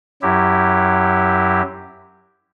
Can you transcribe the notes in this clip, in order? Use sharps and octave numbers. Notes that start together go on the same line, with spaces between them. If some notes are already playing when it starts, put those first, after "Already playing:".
F#2 F#3 E4 G4